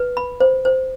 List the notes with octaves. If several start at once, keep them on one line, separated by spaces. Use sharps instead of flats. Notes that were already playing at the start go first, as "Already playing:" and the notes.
Already playing: B4
B5
C5
C5